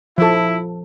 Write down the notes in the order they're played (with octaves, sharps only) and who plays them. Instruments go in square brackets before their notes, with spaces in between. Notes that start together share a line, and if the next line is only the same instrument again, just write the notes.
[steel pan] F3 A4 [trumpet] E4